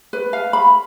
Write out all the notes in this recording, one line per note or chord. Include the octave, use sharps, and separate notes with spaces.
B4
F5
B5